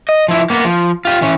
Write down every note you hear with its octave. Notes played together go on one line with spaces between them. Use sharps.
D#5
F3 E4
A#3 B3
F3
F4 G4
E3 C#4